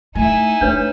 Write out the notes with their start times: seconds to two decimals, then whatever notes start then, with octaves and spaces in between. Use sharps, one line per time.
0.15 A3 D#4 E4 G#5
0.61 A3 D4 B4 C#5